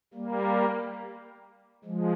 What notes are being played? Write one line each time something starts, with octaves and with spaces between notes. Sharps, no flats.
G3 A#3
F3 G#3